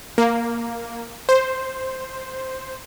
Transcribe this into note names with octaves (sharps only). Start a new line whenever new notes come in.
A#3
C5